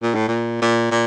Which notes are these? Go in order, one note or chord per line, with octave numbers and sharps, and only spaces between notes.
A#2
A2
A#2
A#2
A#2